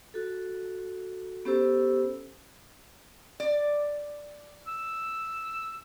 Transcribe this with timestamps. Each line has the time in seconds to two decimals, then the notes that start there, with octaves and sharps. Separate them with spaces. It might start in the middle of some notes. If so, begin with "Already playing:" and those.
0.14 F#4 A4
1.45 B3 C#4 G4 A4 C5 E6
3.40 D5
4.67 E6